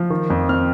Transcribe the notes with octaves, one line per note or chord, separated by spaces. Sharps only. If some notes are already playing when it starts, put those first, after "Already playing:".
Already playing: F3 F6
D#3
F2
C4 F6